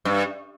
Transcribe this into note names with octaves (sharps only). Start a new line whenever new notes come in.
G2